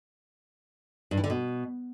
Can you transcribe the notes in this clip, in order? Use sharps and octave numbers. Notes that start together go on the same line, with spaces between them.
G2
E3
D3
B2